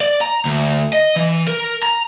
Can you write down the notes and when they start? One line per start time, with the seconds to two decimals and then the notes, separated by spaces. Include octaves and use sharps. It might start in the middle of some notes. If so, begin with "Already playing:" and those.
0.01 D5
0.21 A#5
0.45 D2
0.93 D#5
1.16 E3
1.48 A#4
1.83 A#5